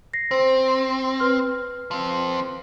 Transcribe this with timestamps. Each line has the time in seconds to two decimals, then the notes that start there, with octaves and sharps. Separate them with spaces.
0.14 A#6 C7
0.31 C4 C5
1.20 B4 F6
1.91 F3 C4